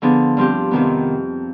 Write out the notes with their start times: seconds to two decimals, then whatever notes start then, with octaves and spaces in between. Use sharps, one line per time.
0.02 D3 F3 B3 D4 G#4
0.37 G2 F3 C4 G4
0.71 F2 C3 D#3 B3